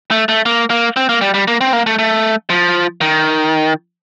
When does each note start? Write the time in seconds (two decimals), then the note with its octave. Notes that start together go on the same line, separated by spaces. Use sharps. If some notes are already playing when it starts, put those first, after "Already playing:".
0.11 A3
0.29 A3
0.46 A#3
0.70 A#3
0.97 C4
1.09 A#3
1.21 G3
1.34 G3
1.48 A#3
1.61 C4
1.73 A#3
1.86 A3
1.99 A3
2.50 F3
3.01 D#3